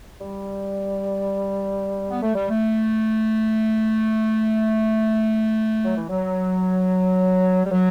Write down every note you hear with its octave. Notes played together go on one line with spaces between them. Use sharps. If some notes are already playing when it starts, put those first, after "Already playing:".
G3
B3
A3
G3
A3
F#3
E3
F#3
G3
F#3